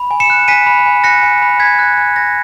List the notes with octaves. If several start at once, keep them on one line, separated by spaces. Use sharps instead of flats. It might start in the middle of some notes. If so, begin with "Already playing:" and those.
Already playing: B5
G#5
C#7 E7
F#6
G#5 B6 D#7
B5
G#5
F#6 A#6 C#7
G#5
B5
G#5 G#6 B6
F#6
G#5
B5 A#6